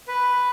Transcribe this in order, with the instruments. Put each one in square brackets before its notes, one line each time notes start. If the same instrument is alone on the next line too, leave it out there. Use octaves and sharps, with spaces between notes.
[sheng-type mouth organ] B4